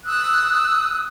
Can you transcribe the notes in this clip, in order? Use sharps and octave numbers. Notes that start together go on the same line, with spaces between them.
D#6 E6 F#6